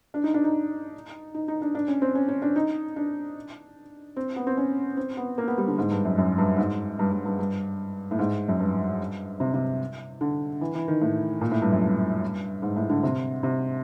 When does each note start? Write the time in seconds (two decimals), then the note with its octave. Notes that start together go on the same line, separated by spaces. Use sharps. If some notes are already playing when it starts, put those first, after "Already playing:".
0.14 D4
0.24 D#4
0.34 D4
0.44 D#4
1.34 D#4
1.48 D#4
1.62 D4
1.75 D4
1.88 C#4
2.02 C4
2.15 C#4
2.28 C#4
2.42 D4
2.56 D#4
2.96 D4
4.16 C4
4.36 B3
4.47 C4
4.57 C#4
4.97 C4
5.17 B3
5.38 A#3
5.48 B3
5.58 G3
5.68 D3
5.78 G#2
5.91 G2
6.05 F#2
6.18 F#2
6.38 G2
6.58 G#2
6.99 G2
7.12 G2
7.25 G2
7.39 G2
8.11 A2
8.19 G#2
8.48 F#2
8.60 G2
9.40 C3
9.54 C3
10.21 D3
10.61 E3
10.75 E3
10.88 D#3
11.02 A2
11.41 A#2
11.51 A2
11.62 G2
11.72 F#2
11.82 G2
12.62 G#2
12.76 A2
12.90 D3
13.03 C3
13.43 C3